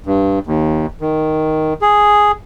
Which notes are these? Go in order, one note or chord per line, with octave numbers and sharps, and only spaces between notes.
G2
D#2
D#3
G#4